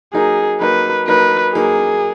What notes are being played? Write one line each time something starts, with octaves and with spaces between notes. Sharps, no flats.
F#3 A#3 D#4 G#4
F#3 A#3 D#4 B4
F#3 A#3 D#4 B4
F#3 A#3 D#4 G#4